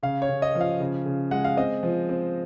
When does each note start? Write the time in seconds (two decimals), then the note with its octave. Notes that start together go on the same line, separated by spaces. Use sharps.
0.03 C#3 F5
0.22 C#5
0.29 C#3
0.42 D#5
0.55 F3
0.61 F5
0.80 C#3
1.06 C#3
1.31 G#3 F#5
1.45 F5
1.57 C4 D#5
1.83 F3
2.09 C4